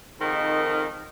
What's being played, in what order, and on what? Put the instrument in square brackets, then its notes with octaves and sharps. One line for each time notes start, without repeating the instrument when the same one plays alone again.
[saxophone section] F2 G#2 D#3